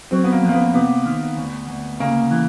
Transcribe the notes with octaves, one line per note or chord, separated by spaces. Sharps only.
F#3 C4
B3
A#3
F2
A#3
B3
C3 B3
D#3
D2
D2
C#3 A#3
E3